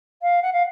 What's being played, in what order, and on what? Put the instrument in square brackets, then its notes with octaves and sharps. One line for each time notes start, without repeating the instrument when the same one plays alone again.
[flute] F5
F#5
F5